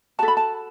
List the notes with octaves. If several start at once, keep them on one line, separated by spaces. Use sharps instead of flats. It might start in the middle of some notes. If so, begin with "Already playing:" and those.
F#4 A4 A5
B5
A5